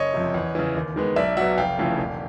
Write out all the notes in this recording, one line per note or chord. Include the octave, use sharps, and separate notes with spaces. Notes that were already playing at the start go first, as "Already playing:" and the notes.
Already playing: F#1 C#5 D#5
F2 C3
E2
C#3 E3
D#2
D#3 G#3 B3
B1 D5 E5
B2 F#3 E5 F#5
F1 F5 G5
F2 C#3 E3 A3
E1